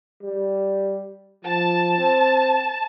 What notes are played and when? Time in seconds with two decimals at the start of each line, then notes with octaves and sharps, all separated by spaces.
0.22 G3
1.45 F3 A5
1.98 C4